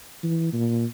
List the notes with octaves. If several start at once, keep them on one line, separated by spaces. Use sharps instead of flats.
E3
A#2